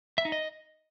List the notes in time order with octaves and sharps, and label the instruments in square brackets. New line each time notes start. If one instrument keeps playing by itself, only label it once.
[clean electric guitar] E5
D#4
D#5